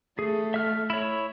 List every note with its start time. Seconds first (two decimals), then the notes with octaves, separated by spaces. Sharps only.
0.19 A3 G#4
0.54 E5 F6
0.90 E4 C#5